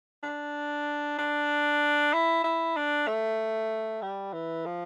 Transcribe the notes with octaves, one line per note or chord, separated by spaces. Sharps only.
D4
D4
E4
E4
D4
A3
G3
E3
F3